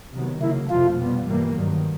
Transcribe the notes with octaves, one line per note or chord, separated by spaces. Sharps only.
C3 D#3 F#3 B3
C#3 F#3 A#3 E4
F2 C3 F3 A3 F4
B2 G3 B3
G2 E3 G3 A#3
G2 D#3 F#3